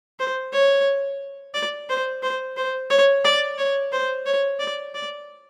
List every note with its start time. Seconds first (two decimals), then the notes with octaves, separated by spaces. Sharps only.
0.19 C5
0.53 C#5
1.54 D5
1.89 C5
2.23 C5
2.57 C5
2.90 C#5
3.25 D5
3.58 C#5
3.92 C5
4.26 C#5
4.60 D5
4.94 D5